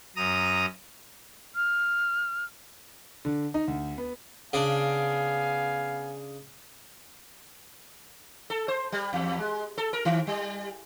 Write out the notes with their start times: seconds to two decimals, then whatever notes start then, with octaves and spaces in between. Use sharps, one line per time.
0.16 F#2 A#5 D#6
1.56 F6
3.25 D3
3.54 D#4
3.68 D2
3.98 B3
4.53 C#3 B3 D4 F5 G#5
8.50 A4
8.68 C5
8.92 G3
9.13 E2
9.38 G#3
9.78 A4
9.93 A#4
10.05 D#3
10.27 G3